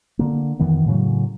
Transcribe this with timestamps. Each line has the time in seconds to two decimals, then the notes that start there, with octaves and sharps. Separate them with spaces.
0.19 D3 A#3
0.59 F2 D#3 E3 B3
0.86 A2 C#3 F#3